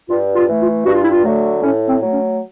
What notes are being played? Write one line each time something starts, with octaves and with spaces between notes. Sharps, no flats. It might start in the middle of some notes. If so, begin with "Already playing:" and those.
G2 F4
F4
E3 A3
F4
G2 F#4
F4
E4
F4
D3 F#3 A3
A2 C#4
C4
F#3 A3
C#4